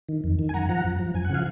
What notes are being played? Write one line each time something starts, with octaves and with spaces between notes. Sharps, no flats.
D#3
F2
D#3
G#5
F#2 F#5 A#5
F3 F#5 A#5
F#2
F3
F#2 G#5
F#5
C#3 F3 F5 G#5